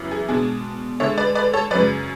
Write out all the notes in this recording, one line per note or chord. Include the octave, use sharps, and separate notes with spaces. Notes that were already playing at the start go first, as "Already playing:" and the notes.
Already playing: F#2 C#3 E3 B3
G#4
B2 G#3 D4 G#4
D3 G#3 D4 C#5 E5
B4 D5
B4 D5
A4 C#5
F#2 C#3 F#3 B4 D5